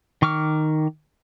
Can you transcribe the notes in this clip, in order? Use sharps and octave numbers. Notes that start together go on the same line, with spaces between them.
D#3 C#6 D6 F6